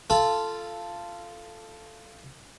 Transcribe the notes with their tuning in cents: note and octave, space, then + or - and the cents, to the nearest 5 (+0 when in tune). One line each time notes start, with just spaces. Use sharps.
F4 -15 A4 +0 B5 -10